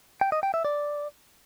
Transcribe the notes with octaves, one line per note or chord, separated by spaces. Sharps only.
G5
D#5
G5
E5
D5